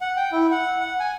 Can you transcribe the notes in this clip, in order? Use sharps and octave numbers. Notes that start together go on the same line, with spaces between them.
F#5
G5
E4
F#5
F#5
G#5